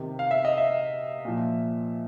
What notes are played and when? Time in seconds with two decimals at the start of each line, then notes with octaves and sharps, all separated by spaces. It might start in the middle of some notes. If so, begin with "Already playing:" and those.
Already playing: C3 D#3
0.19 F5
0.31 E5
0.45 D#5
0.58 E5
1.25 A#2 F3